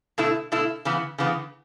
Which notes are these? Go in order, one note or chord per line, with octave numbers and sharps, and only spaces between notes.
B2 A3 E4
B2 A3 E4
C#3 E3 B3
C#3 E3 B3